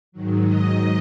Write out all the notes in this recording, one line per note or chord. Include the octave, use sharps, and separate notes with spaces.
G#2 D#3 F#3
D#5